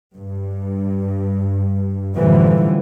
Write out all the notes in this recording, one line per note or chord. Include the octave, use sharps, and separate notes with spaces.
G2
F#2 A2 D3 E3 F3 G3